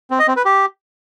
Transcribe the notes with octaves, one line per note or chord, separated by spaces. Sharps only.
C4
D#5
C4
B4
G4